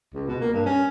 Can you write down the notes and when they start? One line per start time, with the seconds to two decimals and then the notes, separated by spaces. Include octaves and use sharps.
0.14 C#2
0.27 B2
0.41 A#3
0.53 G2
0.66 C#4